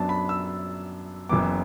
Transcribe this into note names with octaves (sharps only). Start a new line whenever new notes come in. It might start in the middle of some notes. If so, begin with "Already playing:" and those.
Already playing: F#2 F#3 B3 D4 A5
B5
E6
F#1 F#2 E3 B3 D6